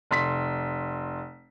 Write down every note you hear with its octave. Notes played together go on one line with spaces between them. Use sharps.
F1 C6 B6